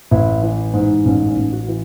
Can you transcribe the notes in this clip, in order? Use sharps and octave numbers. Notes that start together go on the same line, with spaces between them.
A1 E4
E3
G#2
A1 C#4
C#4
A1
F#4
E3